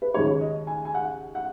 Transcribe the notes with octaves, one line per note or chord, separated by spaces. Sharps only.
B4
D#2 C#3 G#3 C#5
D#5
G#5
G#5
F#5
F#5